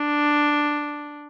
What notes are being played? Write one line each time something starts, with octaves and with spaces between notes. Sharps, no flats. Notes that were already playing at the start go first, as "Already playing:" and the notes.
Already playing: D4